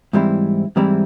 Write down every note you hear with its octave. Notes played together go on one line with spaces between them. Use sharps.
G#2 E3 G3 C4 E4
G#2 E3 G3 C4 E4